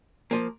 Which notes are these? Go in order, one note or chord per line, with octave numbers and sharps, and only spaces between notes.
F3 A#3